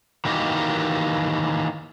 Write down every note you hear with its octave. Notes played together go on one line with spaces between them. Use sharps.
D#3 E3 A#3 D#4 F#4 G4